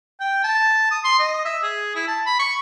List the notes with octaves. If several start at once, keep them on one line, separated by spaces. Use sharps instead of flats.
G5
A5
D#6
C6
D#5
E5
G#4
E4
A5
B5
C#6